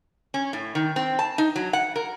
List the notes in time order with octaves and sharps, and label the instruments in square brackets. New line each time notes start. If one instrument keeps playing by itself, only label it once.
[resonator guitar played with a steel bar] C#4
A2
D#3
C4
A5
D#4
F#3
F#5
A#4